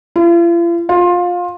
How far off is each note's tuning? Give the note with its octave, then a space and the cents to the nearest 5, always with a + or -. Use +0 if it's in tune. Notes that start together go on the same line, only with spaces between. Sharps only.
F4 -45
F4 +20